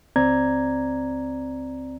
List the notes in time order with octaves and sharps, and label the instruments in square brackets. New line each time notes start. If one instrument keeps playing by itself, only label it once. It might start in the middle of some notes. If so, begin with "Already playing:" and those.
[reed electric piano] C#2 C4 D5 A#5 G#6